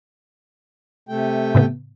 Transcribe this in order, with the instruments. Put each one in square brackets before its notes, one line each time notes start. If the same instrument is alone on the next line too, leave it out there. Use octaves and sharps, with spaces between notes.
[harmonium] C3 A3 G5
[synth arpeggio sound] A2 C#3 B3